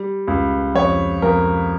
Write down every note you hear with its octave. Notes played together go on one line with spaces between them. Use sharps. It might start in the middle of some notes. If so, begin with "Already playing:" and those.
Already playing: G3
C#2
F2 C#5
F2 A#4